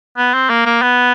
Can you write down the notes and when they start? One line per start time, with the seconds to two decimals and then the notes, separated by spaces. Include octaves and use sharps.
0.17 B3
0.34 C4
0.50 A#3
0.66 A#3
0.82 B3